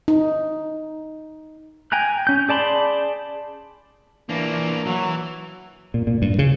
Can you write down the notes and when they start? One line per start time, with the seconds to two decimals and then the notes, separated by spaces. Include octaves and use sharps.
0.08 D#4
1.92 G5 G#5 A#5 F#6
2.27 C#4 G6
2.49 G#4 D5 A5 B5 C6
4.29 E3 A#3 D4
4.86 E3 F#3
5.94 A#2
6.07 A#2
6.22 G2
6.39 C#3